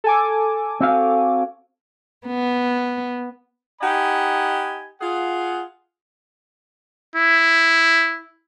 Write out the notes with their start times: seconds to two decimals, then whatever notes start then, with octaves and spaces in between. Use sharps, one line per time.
0.04 A4 G#5 D6
0.81 C4 F#4 F5
2.26 B3
3.81 D#4 G4 D#5 F#5 G#5 B5
5.01 F4 G#4 F#5
7.16 E4